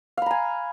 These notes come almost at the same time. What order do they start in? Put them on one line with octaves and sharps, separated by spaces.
F5 B5 A#5 G#5